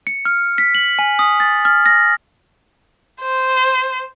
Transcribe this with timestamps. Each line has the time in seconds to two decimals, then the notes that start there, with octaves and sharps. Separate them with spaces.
0.07 C#7
0.25 F6
0.58 B6
0.75 F#7
0.99 G#5
1.19 D#6
1.40 A6
1.65 F6
1.86 A#6
3.21 C5